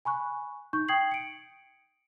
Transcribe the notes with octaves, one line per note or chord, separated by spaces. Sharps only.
G#5 B5 C#6 F#6
D#4 C#6 G6
G5 D#6 G#6 C7 F#7
C#7 D7